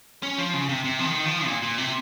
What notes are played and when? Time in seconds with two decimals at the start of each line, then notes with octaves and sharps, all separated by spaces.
0.23 C#4
0.38 F3
0.54 C#3
0.69 C3
0.85 C3
0.99 F3
1.05 D#3
1.26 F3
1.46 A#2
1.62 A#2
1.78 C3